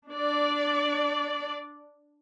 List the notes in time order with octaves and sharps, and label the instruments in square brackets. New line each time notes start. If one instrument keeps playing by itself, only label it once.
[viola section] D4 D5